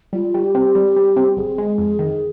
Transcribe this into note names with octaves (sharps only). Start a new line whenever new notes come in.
G3 F4
G3
G4
C4
G3
G3
C4
G1 G#4
G#3
F2
D#3